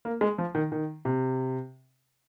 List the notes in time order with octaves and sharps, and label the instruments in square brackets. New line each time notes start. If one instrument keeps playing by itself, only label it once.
[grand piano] A#3
G#3
F3
D#3
D#3
C3